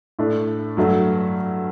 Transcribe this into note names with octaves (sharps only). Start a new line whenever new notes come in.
A2 A3 D4
G2 F#3 A3